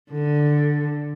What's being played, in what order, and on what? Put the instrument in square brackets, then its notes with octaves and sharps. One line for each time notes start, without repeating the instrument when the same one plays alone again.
[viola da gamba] D3